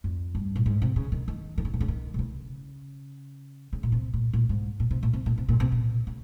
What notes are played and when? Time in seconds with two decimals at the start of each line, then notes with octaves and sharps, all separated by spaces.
0.04 F2
0.35 G2
0.56 A#2
0.66 G#2
0.82 C3
0.96 C#3
1.12 D#3
1.28 D#3
1.58 D#3
1.65 C#3
1.74 C3
1.80 C#3
1.88 D#3
2.14 C3
2.19 C#3
3.73 C#3
3.83 A#2
3.92 C3
4.14 A#2
4.33 A#2
4.49 G#2
4.80 A#2
4.91 C3
5.03 A#2
5.13 C3
5.26 A#2
5.38 C3
5.49 A#2
5.60 C3
5.72 A#2
6.07 C#3